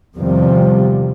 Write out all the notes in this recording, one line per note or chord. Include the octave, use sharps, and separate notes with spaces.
E2 C3 D#3 F3 G3